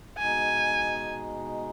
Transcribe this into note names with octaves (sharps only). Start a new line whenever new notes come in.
B2 G#3 D#4 G#5